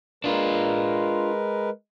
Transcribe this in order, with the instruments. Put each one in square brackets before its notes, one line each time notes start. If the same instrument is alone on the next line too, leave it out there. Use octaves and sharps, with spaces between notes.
[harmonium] G#3 A#4 B4 [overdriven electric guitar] D4 F4